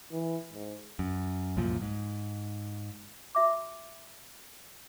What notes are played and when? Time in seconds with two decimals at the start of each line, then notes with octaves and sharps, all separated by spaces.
0.11 E3
0.53 G#2
0.99 F#2
1.57 C2 F#2 A#2 F3
1.82 G#2
3.35 F#4 E5 D6